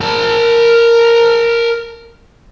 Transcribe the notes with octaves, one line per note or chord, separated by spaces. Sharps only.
A#4 A5